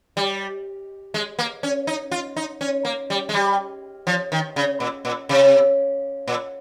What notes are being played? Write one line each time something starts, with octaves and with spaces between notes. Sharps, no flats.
G3
G#3
A#3
C#4
D#4
F4
D#4
C#4
A#3
G3
G#3
G3
F3
D#3
C#3
A#2
A#2
C3
A#2